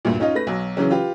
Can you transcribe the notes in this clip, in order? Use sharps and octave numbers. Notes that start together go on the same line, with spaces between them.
D2 G2 A#2
C#4 D#4 F4 C#5 D#5
A3 B4 A#6
B1 F#3
C#3 E3 F#3 C#4
F4 G4 B4